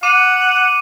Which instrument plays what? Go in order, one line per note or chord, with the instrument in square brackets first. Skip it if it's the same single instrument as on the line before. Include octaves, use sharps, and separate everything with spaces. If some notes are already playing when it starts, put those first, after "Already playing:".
[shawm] F#5 [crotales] D6 D#7